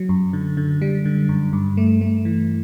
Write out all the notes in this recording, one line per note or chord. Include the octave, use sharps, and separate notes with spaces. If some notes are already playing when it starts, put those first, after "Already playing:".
Already playing: F#3
F#2
D3
D3
G3
D3
F#2
G2
A3
A3
E3